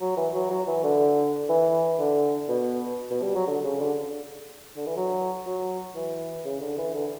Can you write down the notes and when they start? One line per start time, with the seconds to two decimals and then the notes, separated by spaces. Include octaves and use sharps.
0.01 F#3
0.17 E3
0.34 F#3
0.50 F#3
0.67 E3
0.84 D3
1.49 E3
1.99 D3
2.49 B2
3.11 B2
3.23 G3
3.35 F#3
3.47 D3
3.64 C#3
3.80 D3
4.77 D3
4.86 E3
4.97 F#3
5.46 F#3
5.95 E3
6.45 C#3
6.61 D3
6.78 E3
6.94 D3